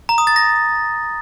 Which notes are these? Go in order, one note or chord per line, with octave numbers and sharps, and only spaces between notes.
A#5
D#6
A6
A#6